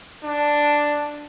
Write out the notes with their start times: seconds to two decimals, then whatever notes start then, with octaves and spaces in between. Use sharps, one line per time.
0.25 D4